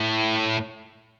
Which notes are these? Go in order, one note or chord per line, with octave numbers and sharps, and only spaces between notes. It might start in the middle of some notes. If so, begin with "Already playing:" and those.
Already playing: A2